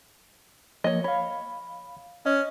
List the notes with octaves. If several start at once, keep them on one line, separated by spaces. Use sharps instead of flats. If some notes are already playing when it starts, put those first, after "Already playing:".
F3 A#3 C#5 D#5
C#5 F5 B5
C#4 D#5